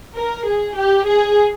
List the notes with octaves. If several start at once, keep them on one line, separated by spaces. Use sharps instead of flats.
A#4
G#4
G4
G#4